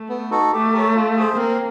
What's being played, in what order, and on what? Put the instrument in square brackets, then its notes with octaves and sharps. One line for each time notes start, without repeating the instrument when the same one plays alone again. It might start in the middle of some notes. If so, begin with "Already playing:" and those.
Already playing: [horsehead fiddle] A3
[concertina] B3
D#4 F#4 A4
[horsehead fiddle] A3 [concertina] G4
[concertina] A#4 C#5
F4
G#4 C5
[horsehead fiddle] A#3 [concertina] C4